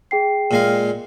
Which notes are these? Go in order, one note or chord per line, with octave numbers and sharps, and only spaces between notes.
G#4 G5 C7
A#2 G#3 F5